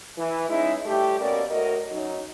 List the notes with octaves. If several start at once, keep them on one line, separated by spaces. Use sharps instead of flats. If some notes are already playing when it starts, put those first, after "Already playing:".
E3
G#3 C#4 D#4 E4
A2 G3 A3 G4
B2 A#3 C#4 A#4 D5
A2 F#4 A#4 D#5
F#2 F#3 D#4